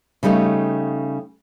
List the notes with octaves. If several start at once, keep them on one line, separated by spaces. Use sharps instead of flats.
C#3 G3 A3 D#4